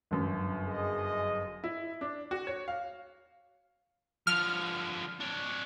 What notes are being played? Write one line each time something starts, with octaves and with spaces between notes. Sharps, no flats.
G1 F#2
G#4 D#5
E4
D4
F#4
C#5
F5
D3 F3 F6
D4 C#5